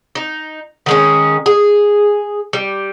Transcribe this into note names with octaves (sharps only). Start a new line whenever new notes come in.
D#4
D#3 G#3 C#4
G#4
G3